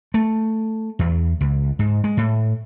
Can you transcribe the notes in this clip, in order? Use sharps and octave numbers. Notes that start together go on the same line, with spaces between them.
A3
E2
C#2
G#2
G#3
A2